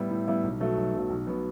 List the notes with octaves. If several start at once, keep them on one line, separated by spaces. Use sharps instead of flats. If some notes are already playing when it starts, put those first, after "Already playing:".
Already playing: A2 G3 B3 E4
A2
G3 B3 E4
B1
B2 F#3 A3
B1
B2 F#3 A3
B1
B2 F#3 B3